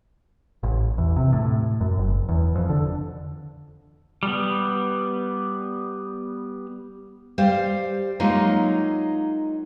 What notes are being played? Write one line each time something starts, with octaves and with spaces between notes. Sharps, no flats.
A1
E2
C3
A2
F#2
F#1
E2
F2
D3
G3 B3
G3 G4 C5 F5
F#3 G#3 A#3 D#4 F4